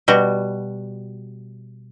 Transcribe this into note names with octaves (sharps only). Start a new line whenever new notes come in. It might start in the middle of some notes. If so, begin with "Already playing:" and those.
B2 G3 F#4